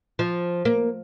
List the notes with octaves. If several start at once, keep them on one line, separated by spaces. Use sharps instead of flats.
F3
A#3